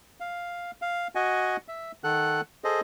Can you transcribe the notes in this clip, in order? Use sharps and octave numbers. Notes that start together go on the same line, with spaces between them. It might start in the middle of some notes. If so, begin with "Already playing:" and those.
F5
F5
F#4 D#5 F#5 G#5
E5
D#3 A4 F#5 F#6
G#4 A4 C5 D#5